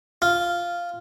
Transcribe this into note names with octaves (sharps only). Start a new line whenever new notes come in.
F4